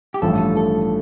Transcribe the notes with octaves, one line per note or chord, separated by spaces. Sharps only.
G4
A1 G2 F3 A3 A4
A4